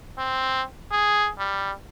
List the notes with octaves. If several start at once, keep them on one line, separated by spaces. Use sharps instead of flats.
C4
G#4
G3